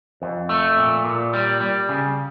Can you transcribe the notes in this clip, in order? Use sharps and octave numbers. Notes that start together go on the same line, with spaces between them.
F2
A3
A#2
A#2
G3
G3
C#3